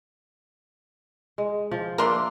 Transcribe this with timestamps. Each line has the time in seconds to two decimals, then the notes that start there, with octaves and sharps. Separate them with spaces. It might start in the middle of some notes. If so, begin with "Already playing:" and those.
1.38 G#3
1.71 F3
1.98 A#3 D4 A#4 E5 C6